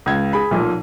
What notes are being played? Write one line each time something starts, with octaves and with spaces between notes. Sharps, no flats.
C#2 G#6
G#4 B5
B1 A#2